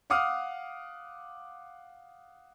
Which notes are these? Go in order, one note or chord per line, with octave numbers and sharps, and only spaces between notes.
F5 F#5 D6 D#6 F6